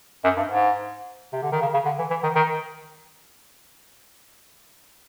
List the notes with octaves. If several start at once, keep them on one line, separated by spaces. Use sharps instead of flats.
F#2
G2
G#2
C3
D3
D#3
C#3
C#3
D3
E3
E3
D#3
D#3